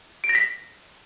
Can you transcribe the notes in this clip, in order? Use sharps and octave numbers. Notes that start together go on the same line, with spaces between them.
D7
A#6
B6